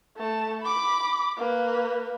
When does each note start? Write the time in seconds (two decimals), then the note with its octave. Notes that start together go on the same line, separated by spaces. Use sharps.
0.17 A3 A5
0.62 B5 D6
1.37 A#3 B4